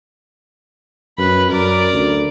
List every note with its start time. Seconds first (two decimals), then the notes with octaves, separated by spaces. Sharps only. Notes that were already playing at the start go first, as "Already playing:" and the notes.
1.18 F#2 B4 B5
1.51 F#2 A#4 D5
1.94 D2